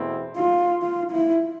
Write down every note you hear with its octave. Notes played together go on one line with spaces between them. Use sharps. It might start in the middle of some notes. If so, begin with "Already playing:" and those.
Already playing: E2 B2 A3 C4 E4
F4
F4
E4